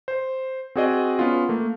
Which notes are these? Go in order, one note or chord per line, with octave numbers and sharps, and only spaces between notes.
C5
C4 F#4 G#4 D5 D#5
B3 C#4 F4
A3 A#3